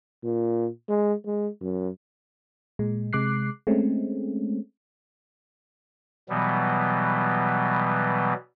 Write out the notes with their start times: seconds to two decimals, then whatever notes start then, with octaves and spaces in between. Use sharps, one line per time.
0.24 A#2
0.89 G#3
1.26 G#3
1.61 F#2
2.79 A#2 G#3
3.13 C3 G#3 D6 F#6 C7
3.67 G#3 A3 C4 C#4
6.29 B2 E3 F#3 G3 B3